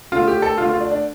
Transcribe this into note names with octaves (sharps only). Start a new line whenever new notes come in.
D3 A3 F4
G4
A4
D3 A3 F4
F4
D4
D4